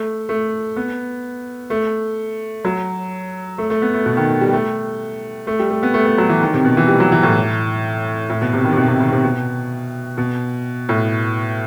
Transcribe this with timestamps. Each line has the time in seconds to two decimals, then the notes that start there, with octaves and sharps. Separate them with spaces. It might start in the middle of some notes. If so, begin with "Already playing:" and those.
Already playing: A3
0.29 A3
0.76 B3
1.70 A3
2.65 F#3
3.58 A3
3.70 A3
3.82 B3
3.94 A3
4.06 B2
4.17 D#3
4.41 G3
4.53 A3
5.47 A3
5.59 G3
5.70 A3
5.83 B3
5.94 A3
6.06 A3
6.18 F#3
6.29 E3
6.41 D#3
6.53 C3
6.65 B2
6.77 E3
6.88 G3
7.00 F#3
7.12 E3
7.23 A2
8.30 A2
8.41 B2
8.53 C3
8.64 D#3
8.72 C3
8.77 B2
8.88 C3
9.00 D#3
9.12 C3
9.24 B2
10.18 B2
10.89 A2